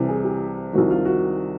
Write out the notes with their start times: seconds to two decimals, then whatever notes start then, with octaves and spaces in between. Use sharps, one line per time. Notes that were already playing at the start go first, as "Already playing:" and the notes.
Already playing: C2 C3 E3
0.09 G#4
0.25 G4
0.73 C2 C3 D#3 F#4
0.90 F4
1.05 F#4